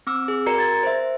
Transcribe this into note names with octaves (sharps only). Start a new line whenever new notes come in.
C4 D6 E6
G#4
F#4 A#4 D5 A#5 C#7
G#6 A6
C5 E5